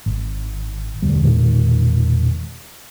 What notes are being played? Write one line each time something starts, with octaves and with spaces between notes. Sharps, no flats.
G#1
E1 D2 G3
E1 A#2 D#3 G#3